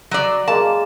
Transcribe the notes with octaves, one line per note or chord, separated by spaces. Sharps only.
F#3 D5
G#3 A#3 A5